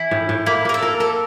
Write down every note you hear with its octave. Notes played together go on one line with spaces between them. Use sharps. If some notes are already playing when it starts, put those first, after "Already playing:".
Already playing: E3 E4
A2
A2
A#3 E4
A#3 A#4
A4
A#4
A4 A#4